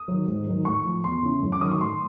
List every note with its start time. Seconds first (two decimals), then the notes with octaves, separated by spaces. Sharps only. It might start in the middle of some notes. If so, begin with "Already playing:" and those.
Already playing: D#6
0.08 D#3 F#3
0.27 G#2
0.47 D#3 F#3
0.65 A2 C#6
0.85 F3
1.04 E2 C6
1.23 C#3 E3
1.42 F#2
1.52 D6
1.61 D#3 F#3 D#6
1.71 C#6
1.80 A2 C6